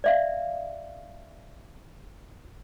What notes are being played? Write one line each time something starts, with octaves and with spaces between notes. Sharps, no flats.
D5 E5 F5